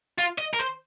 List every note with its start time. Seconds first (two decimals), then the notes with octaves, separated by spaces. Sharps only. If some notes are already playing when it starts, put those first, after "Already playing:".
0.18 F4
0.38 D#5
0.53 A#4
0.59 C5